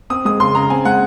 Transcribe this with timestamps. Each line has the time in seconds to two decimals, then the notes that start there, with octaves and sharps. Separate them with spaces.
0.10 C4 D#6
0.25 G#3 D#6
0.40 C#3 C6
0.55 C#3 A#5
0.70 C4 G#5
0.85 G#3 F#5